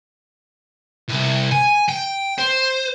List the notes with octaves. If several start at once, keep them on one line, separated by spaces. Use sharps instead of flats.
C2
G#5
G5
C5